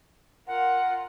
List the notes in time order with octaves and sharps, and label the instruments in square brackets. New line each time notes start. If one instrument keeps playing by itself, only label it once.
[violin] F4 A#4 [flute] F#5